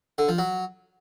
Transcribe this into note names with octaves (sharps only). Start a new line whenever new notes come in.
D3
F3
F#3